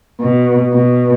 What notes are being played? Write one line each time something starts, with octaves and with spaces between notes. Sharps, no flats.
B2
B2